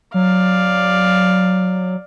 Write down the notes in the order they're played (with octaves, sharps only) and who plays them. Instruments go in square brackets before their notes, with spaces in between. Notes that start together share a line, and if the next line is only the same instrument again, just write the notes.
[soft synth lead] F#3 [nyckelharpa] D5 F5